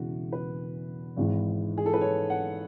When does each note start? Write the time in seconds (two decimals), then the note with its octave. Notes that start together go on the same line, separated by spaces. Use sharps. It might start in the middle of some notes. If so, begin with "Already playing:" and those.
Already playing: E1 E2 C#3 E3 F#4
0.32 B4
1.16 G#1 G#2 E3
1.78 G#4
1.86 A4
1.93 B4
2.01 C#5
2.30 F#5